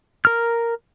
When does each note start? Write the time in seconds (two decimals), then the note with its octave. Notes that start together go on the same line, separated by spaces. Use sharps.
0.25 A#4 F6